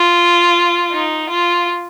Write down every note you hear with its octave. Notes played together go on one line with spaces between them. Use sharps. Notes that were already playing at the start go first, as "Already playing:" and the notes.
Already playing: F4
D#4
F4